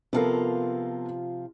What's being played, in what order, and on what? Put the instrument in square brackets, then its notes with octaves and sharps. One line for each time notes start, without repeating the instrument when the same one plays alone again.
[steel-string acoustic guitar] C3 F3 F4 [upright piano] B3 A4 A#4